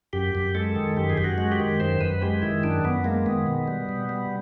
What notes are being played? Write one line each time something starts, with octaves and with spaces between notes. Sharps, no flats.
F#2 G4
F#2
G#3 A4
D#3
F#2 G4
G#4
F#2 G4
F#4
G#3
G4
D#3
F#2 C5
F#2 B4
G#3 G4
D#3 E4
F#2 D4
F#2 B3
G#3 A#3
D#3 B3
B2
G3
B2
G3